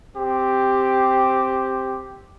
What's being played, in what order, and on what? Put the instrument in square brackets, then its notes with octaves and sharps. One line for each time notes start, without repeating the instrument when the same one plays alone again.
[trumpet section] C4 G4